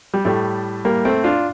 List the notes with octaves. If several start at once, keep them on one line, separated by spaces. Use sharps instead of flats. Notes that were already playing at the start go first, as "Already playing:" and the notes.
G3
A2 G3 A3
G3 A#3
A3 C4
D4 F4